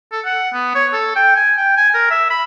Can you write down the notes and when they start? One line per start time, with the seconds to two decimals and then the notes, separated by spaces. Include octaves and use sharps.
0.12 A4
0.25 F#5
0.54 B3
0.75 C#5
0.93 A4
1.16 G5
1.36 G#5
1.57 G5
1.77 G#5
1.94 A#4
2.11 E5
2.30 B5